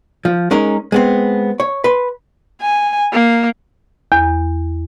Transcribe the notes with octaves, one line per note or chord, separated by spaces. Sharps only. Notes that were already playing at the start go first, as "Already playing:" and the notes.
F3
G#3 C#4 D#4 A#4
G#3 B3 C4
C#5
B4 C6
G#5
A#3
E2